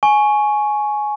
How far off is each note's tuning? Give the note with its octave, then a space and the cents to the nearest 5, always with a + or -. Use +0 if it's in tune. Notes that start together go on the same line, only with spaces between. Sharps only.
G#5 +15 C#6 +0